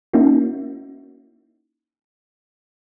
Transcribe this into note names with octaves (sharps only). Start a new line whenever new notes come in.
A#3 C#4 D#4 E4 F#4